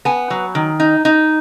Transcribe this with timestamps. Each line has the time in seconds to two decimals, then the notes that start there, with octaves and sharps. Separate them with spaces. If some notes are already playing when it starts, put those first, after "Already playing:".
0.05 B3 G#5
0.30 F#3
0.55 D#3
0.80 D#4
1.05 D#4